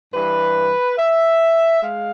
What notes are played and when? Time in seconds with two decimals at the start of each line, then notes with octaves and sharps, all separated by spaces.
0.14 G2 E3 G3 B4
0.98 E5
1.82 G#3 F5